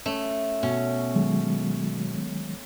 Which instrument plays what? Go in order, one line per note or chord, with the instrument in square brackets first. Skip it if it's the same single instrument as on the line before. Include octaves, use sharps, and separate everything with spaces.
[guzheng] A3 [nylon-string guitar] C#4
[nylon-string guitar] B2 [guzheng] C#4
[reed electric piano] D#3 F#3 G#3